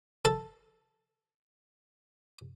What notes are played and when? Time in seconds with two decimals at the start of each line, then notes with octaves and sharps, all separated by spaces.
0.25 A4 A5